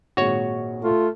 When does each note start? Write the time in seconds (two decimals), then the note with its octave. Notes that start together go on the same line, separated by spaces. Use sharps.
0.17 G#1 A#2 F#4 G#4 C#5
0.83 A3 F4